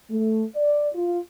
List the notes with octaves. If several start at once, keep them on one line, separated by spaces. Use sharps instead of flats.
A3
D5
F4